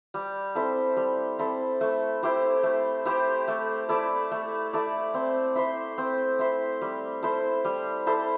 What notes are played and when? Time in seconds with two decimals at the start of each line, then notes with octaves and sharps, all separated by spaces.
0.14 G3
0.55 C4 E4 A4
0.97 G3
1.39 C4 E4 A4
1.81 A3
2.23 E4 G4 C5
2.63 A3
3.05 E4 G4 C5
3.48 A3
3.89 E4 A4 D5
4.31 A3
4.73 E4 A4 D5
5.14 C4
5.55 E4 C5 E5
5.98 C4
6.39 E4 C5 E5
6.81 G3
7.23 E4 A4 C5
7.65 G3
8.07 E4 A4 C5